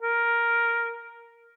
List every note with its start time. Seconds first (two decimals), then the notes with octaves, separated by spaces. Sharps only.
0.02 A#4